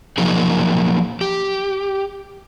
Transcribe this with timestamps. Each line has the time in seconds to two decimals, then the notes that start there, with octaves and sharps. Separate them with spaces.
0.18 F3 F#3 A#3 D#4 G#4
1.21 G4